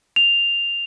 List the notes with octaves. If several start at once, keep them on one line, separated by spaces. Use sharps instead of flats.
F7